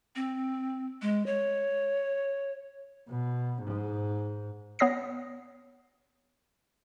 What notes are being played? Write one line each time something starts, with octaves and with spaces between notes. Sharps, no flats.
C4
G#3
C#5
B2
G#2
B3 C#5 D#6 A#6 C7